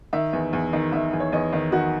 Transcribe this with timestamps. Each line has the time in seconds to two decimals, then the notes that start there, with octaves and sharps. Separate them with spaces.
0.13 D#3 E5
0.33 E2
0.53 E2
0.73 D#3
0.92 D#3 E5
1.13 E2
1.20 C#5
1.32 E2 D#5
1.53 D#3
1.72 D#3 F#4